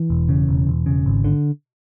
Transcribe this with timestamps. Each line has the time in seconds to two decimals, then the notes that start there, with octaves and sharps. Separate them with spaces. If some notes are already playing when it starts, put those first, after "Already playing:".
Already playing: E3
0.10 E1
0.29 C#3
0.49 E1
0.67 E1
0.86 C#3
1.06 G#1
1.24 D3